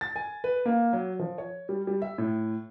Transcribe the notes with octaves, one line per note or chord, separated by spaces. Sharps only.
A6
G#5
B4
A#3
F#3
F3
C#5
G3
G3
E5
A2